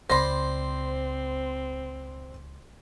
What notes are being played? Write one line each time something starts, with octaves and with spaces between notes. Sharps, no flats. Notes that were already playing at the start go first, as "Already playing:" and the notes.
C#2 C4 C5 D5 B5 C6 A#6